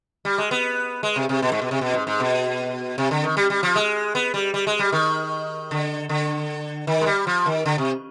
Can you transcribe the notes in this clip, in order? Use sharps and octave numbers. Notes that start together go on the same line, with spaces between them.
G3
G#3
B3
G#3
C3
C3
B2
G#2
B2
C3
B2
G#2
G#2
B2
C3
D3
D#3
G3
G3
F3
G#3
B3
G3
G3
G#3
G3
D#3
D3
D3
D#3
G#3
G3
F3
D#3
D3
C3